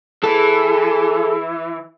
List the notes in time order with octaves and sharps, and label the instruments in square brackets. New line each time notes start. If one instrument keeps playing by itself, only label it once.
[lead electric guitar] E3 [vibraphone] G#4 [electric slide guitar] A4